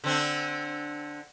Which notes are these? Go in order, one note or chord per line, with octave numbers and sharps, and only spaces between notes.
D3 C4 D4